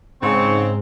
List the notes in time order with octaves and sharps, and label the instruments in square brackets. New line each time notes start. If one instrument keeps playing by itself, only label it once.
[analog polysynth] G#2 [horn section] C#3 C4 [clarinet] C#6